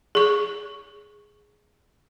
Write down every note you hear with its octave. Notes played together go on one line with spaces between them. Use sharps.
G#4 C#6